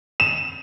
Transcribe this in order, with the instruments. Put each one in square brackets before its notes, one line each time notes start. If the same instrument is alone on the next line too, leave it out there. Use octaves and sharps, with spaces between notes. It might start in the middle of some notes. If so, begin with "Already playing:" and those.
[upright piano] E7